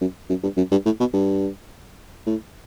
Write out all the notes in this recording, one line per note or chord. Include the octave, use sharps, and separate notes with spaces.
F#2
F#2
G2
F#2
G2
A2
B2
G2
A2